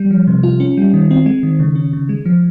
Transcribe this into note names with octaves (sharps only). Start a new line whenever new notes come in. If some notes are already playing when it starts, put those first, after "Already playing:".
Already playing: G3
F3
C3
F4
C#4
G3
D#3
C4
G#3
D#3
C#3
C#4
C#3
G#3
F3